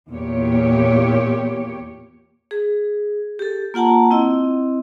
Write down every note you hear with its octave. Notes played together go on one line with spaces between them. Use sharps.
E2 A#2 G4 C#5
G#4
G4 A4
A#3 F4 F#5 A5 A#5
C4 E4 D#5 E6